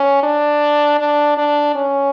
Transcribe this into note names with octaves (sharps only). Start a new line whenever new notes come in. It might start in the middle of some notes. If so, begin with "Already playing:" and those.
Already playing: C#4
D4
D4
D4
C#4